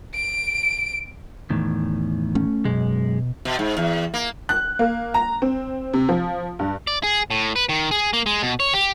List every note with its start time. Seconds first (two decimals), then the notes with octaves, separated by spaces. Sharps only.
0.14 D7
1.50 E2 A2 D#3
2.35 A3 C#4
2.65 F#2 B2 G#3
3.45 B2
3.59 G#2
3.77 E2
4.14 A#3
4.49 F#6
4.79 A#3
5.14 A#5
5.42 C4
5.93 C3
6.09 F3
6.59 G2
6.87 D5
7.03 G#4
7.30 A2
7.56 B4
7.69 D#3
7.91 G#4
8.13 A#3
8.26 G#3
8.42 B2
8.60 C#5
8.74 G4